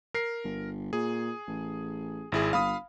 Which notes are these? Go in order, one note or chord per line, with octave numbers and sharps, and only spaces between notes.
A#4 C7
G1
A#2 G#4
A1
G#1 E4 G#4
G1 F5 B5 D#6